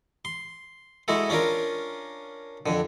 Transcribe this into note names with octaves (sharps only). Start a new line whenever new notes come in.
C6
G#3 E4 F#4 A4
C#4 D4 F4 A#4
F2 D3